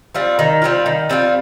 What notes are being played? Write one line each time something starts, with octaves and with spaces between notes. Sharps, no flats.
G3 C4 F4
D#3
G3 C4 F4
D#3
G3 C4 F4